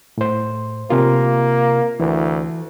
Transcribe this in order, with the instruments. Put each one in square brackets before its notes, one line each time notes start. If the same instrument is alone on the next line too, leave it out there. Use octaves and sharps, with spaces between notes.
[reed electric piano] A2 C5
[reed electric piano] C3 F4 [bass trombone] A#3
[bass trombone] D2 [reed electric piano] E3